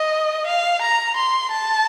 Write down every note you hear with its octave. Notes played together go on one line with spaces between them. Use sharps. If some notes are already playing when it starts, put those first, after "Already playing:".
Already playing: D#5
F5
A#5
C6
A5